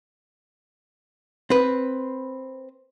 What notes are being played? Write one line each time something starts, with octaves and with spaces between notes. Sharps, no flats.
C4 B4